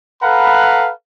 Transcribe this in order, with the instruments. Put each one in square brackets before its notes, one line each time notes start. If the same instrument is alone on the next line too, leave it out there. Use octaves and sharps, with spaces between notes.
[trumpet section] A4 B4 F5 F#5 A#5 B5